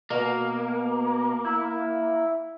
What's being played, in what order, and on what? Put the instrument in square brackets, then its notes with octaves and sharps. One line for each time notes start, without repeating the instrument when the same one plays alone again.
[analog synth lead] B2 [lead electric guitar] A#3
[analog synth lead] E4